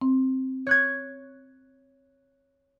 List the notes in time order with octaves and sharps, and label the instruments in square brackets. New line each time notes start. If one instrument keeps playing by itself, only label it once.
[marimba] C4
[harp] C#5 F#6 G#6